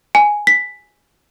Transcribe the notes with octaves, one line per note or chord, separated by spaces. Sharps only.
G#5
B6